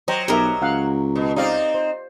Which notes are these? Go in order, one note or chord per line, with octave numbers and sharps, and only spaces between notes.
F#3 C5 D#5 G5 A#5
B1 G4 A#4 D#5 E5
C#2 F5 F#5
B2
C4 D#4 G4 D5 F5
C5